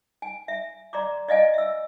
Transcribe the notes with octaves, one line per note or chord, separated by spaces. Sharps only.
G#5
E5
D5 A#5 C6 D6
D5 D#5 F5 G#5
E5 E6